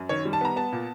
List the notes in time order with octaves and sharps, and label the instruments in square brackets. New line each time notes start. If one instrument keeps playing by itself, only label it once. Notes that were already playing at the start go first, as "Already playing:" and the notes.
Already playing: [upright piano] F#2
D#3 C#5
G3
A5
B3 A#5
B3 A5
A#2